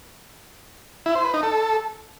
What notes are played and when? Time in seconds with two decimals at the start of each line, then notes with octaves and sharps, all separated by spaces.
1.06 E4
1.15 C5
1.24 B4
1.34 D#4
1.43 A4